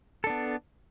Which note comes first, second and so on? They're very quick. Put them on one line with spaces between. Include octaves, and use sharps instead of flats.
A4 D4 B3